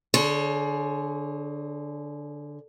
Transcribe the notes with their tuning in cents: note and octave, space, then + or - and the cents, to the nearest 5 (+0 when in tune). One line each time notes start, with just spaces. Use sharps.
D3 +0 G#4 +35 C#5 -20